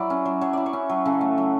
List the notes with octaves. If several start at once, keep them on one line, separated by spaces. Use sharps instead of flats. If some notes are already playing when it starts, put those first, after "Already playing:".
Already playing: F#3 E4 D5
C#4
F#3
F#3 C#5
E4 D5
C#5
C#4
F#3
C#3 A4
A3
F#3